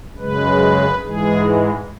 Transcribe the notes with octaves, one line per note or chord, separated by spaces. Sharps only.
F#2 C#3 G#3 B4
G#2 E3 G#3 G#4